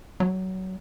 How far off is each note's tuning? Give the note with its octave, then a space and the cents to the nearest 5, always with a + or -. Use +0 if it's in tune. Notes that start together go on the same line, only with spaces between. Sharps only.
F#3 +20